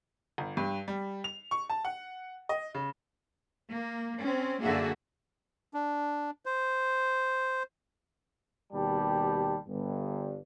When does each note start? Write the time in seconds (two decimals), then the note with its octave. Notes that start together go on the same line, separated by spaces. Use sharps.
0.38 G1
0.57 G2
0.88 G3
1.24 F7
1.51 C#6
1.70 A5
1.85 F#5
2.49 D#5
2.75 C#3
3.70 A#3
4.22 C4 C#4
4.63 F#2 D3 A#3 F#4 G#4 E5
5.74 D4
6.46 C5
8.73 D#2 B2 G3 G4 A5
9.68 G1 G2